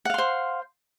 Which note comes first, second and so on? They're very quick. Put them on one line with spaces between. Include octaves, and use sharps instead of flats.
F#5 F5 C6 C5